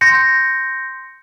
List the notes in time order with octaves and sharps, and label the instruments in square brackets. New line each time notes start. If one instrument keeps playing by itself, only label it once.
[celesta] C6 G6 A#6 C#7